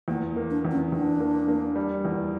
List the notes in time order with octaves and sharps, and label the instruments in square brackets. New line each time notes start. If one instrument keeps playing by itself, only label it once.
[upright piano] E2 [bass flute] A#3
[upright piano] A#3
[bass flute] D4
[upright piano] E2
[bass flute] C#4
[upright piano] E2 [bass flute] D4
[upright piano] A#3
A#3
G3
E2